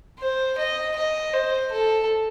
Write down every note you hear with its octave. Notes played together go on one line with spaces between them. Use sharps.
C5
D#5
D#5
C5
A4